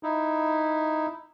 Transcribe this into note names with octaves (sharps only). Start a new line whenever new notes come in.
D#4 E4